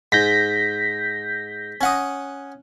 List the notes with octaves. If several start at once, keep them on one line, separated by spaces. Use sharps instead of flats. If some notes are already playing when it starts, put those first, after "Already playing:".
G#2 G6 A#6 B6
C#4 F#5 D#6